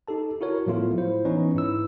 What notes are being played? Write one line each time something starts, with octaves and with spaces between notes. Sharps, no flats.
D#4 G4 A4 A5
E4 F#4 A#4 C#5
A2 F3 F#3 A3 B3 F4
E4 C5
E3 B3 C#4 D#4 B4 C#5
G#2 E4 E6